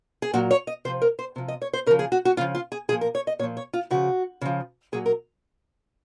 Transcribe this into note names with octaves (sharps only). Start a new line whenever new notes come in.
G#4
A#2 F#3 F#4
C#5
D#5
C3 F3 C5
A#4
C5
C3 F3
D#5
C#5
C5
C#3 F3 A#4
G#4
F#4
F#4
C#3 F3 F4
F4
G#4
A#2 F3 G#4
A#4
C#5
D#5
A#2 F3 C#5
C#5
F4
C#3 F3 F#4
C#3 F3
A#2 F#3 G#4
A#4